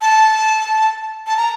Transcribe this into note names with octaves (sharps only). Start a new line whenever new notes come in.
A5
A5
A#5